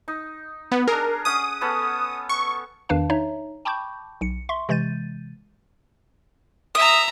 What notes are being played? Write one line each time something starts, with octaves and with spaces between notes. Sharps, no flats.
D#4
B3
D4 G#4 A#4
C#4 F#5 D#6
B3 C#4 A4
C#6
E2 D#3 D4 B4 F5 A5
D#4 C#5 E5 A#5
G5 A5 B5 C#6 D6 G6
B1 C#7
E5 C6 C#6
C3 E3 G#3 G6 A6 D#7
E5 A#5 D#6